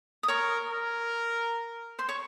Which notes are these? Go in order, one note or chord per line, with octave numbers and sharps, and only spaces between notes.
D#6
A#4 C#5 C#6
A#4
C5 C6
C#5 C#6